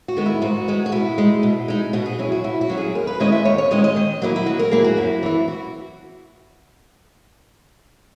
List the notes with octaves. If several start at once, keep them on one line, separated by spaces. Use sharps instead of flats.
F#4
D#3 G#3 B3
E4
G#2 F#4
D#3 G#3 B3
F#4
B2 E4
G#3 D#4
B2
G#3 D#4
B2 F#4
G#4
F#3 C#4 E4
F#4
B2 E4
F#4
F#3 C#4 E4
G#4
D#2 A#4
B4
D#3 G#3 C#4 E4 D#5
E5
D#2 C#5
C#5
D#3 G#3 C#4 E4 D#5
D#5
D#3
F#3 A#3 E4
E4
D#3 F#4
A#4
F#3 A#3 E4 G#4
F#4
F#2 E4
E3 B3 E4
F#4